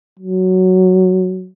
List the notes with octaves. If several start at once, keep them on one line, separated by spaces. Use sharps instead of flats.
F#3